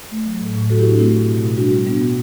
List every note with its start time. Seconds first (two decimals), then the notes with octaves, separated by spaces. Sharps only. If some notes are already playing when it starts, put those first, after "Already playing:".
0.11 A3
0.26 F#3
0.41 A2
0.55 A2
0.69 F#3 F#4 A4
0.79 E4 G4
0.84 A2 D4 F#4
0.98 A3 C4 E4
1.14 A2
1.28 B2
1.43 B2
1.57 G3 D4 F#4
1.72 G3
1.87 G3 B3 D4
2.01 B2 B3